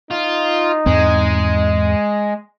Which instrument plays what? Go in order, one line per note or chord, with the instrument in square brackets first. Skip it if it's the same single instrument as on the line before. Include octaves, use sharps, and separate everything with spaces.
[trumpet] D#4 [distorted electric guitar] F4
[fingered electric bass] E2 G#2 C4 [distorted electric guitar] G#3